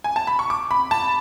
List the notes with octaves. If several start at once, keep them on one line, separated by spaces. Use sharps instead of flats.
G#5
A5
B5
C#6
D6
B5
A5